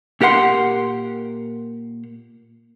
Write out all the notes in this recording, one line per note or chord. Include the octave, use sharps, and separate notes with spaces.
A#2 G4 A#4 F#5 C6